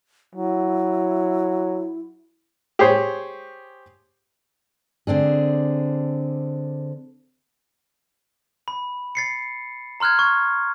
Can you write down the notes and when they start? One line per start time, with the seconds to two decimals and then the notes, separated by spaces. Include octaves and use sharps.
0.35 F#3 E4
2.79 G4 G#4 C5 C#5
5.07 D3 C4 D4 G#4
8.68 B5
9.15 A6 C7 C#7
10.00 A#5 C6 F6 F#6 G#6
10.19 C#6 G#6